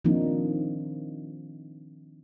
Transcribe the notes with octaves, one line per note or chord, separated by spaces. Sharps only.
D#3 F3 A#3 C4 D4 D#4